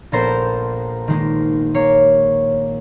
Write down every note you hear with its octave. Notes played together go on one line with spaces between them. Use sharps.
A#1 B3 A4 A#4 C5 A#5
D#3 G#3 A#3
A#3 C#5